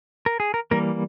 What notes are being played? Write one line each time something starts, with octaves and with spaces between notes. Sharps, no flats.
A#4
G#4
A#4
E3 G3 A#3 A#4